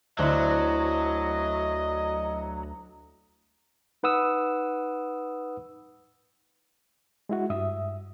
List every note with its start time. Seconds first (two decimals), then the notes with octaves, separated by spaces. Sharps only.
0.19 D2 F#3 D4 E4 C5 D#5 F#6
4.03 D#4 B4 F#5 D#6 E6
7.29 G#3 E4 F#4
7.50 G2 E5 D#6